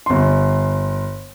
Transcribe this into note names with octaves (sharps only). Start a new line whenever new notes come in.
G1 C6